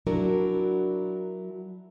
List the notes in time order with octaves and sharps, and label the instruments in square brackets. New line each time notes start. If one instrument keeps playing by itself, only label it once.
[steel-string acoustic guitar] F#3 D4 E4 F#4 A#4